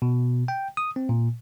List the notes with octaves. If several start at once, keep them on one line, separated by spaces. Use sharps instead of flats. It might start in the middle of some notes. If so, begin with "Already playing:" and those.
B2
G5
D#6
C4
A#2